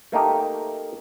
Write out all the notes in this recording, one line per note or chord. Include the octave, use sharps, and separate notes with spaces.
A3 A#3 D#4 G4